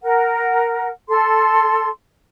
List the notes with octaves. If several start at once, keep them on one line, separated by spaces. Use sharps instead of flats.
A#4 F#5
A4 C6